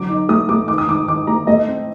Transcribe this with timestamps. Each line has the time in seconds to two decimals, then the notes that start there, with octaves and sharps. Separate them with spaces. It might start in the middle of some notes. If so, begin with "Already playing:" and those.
Already playing: D3 F#3 D6
0.10 D#4
0.29 A3 D#6
0.49 A3 D6
0.68 D#3 D6
0.78 D#6
0.88 D#3 D6
1.08 D#3 D6
1.27 A3 A#5
1.47 A3 D#5
1.67 C4